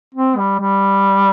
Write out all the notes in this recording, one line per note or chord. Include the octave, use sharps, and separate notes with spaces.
C4
G3
G3